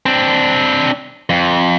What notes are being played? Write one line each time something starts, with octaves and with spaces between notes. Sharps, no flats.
C4 D4
F2